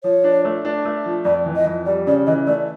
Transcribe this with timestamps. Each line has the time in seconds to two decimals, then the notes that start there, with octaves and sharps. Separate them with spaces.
0.04 F3 C#5
0.24 D4
0.45 A3
0.65 D4
0.85 A3
1.06 F3
1.25 F2 D5
1.46 E3
1.56 D#5
1.66 F2
1.86 G3 D5
2.07 C#3 D5
2.27 E3 D#5
2.47 A3 D5